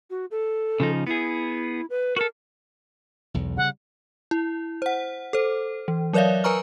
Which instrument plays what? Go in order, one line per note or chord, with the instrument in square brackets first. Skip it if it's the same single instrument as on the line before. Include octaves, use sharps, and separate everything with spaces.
[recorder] F#4
A4
[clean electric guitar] C#3 F3 D#4
[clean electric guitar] B3 G#4 [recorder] E4
[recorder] B4
[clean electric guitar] F#4 A4 [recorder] A#4
[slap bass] B1 E2
[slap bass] C#3 G3 [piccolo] F#5
[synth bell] E4
C5 F#5
A4 C5
E3
F#3 A#4 C#5 D5 E5 F5
A#4 B4 G#5 A#5 C#6 F6